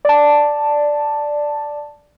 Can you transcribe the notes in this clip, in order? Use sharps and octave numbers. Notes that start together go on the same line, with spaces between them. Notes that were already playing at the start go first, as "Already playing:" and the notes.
D5 A5